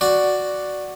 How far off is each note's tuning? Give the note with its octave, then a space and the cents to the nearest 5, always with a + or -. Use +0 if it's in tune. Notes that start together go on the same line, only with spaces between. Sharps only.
F#4 +0 D5 +0